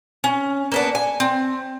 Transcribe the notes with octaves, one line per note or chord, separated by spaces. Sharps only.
C#4
A#3 B3 D4
G#5
C4